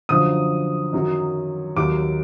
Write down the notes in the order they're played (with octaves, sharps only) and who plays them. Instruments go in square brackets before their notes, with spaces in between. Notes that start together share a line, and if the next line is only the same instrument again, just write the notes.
[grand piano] F#2 D3 F3 D#6
F#2 D#3 F#3
D#2 D#3 F#3 D6